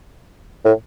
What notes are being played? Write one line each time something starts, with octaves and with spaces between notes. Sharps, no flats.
A2